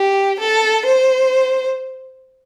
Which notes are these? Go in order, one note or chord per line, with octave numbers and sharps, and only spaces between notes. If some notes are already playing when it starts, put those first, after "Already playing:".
Already playing: G4
A4
C5